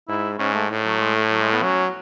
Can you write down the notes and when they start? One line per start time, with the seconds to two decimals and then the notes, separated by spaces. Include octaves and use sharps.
0.08 G#2 E4
0.39 G#2 C#4
0.54 A3
0.70 A2
0.85 F#3
1.01 G#3
1.15 A3
1.32 F#3
1.41 G#3
1.52 B3
1.62 F#3 C#4